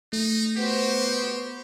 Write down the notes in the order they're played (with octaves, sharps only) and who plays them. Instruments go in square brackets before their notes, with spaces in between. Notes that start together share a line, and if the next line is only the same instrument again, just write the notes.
[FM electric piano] A3 [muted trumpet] D#4
[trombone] B3 [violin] F#4 C5 [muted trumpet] G4